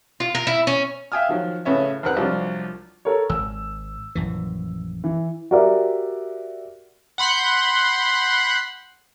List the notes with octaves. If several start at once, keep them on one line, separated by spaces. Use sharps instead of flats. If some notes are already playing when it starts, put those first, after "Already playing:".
F4
A#4
E4
C#4
E5 F5 G5 G#5 D#6 F6
D#3 F3 F#3
A2 C#3 B3 C#4 E5
D#2 C4 A#4 B4 F#5 F#6
C2 F3 F#3 D4
A4 A#4 C#5
G#1 E6
A#1 F#2 E3
E3
F#4 G4 A#4 D5 E5
F#5 B5 C6 F#6 G6